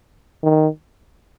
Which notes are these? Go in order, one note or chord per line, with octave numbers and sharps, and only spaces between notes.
D#3